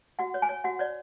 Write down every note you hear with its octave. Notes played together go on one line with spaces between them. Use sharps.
F#4 F#5
C#5
G#5
C#5
F#4 F#5
C#5 D5